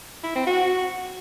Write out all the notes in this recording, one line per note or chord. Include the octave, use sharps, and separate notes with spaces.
E4
C4
F#4